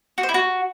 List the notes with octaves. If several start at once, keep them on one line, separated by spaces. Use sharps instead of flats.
F#4
C5
E4
F#4